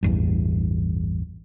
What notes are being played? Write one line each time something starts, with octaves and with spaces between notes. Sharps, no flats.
A1 E2 G2